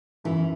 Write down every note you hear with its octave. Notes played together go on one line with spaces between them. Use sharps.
F#2 E3